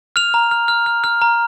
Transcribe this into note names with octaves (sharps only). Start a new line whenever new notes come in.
F6 F7
A#5
F6
F6
F6
F6
A#5